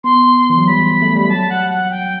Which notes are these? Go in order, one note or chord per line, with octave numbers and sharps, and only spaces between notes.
B3 C6
E3
F#3
G3 B5
A3
G3
F#3 A5
F#5
F#5
G5